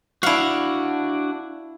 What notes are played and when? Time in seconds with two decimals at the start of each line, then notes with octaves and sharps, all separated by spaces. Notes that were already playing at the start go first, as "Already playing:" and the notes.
0.23 D4 E4 F#4 F5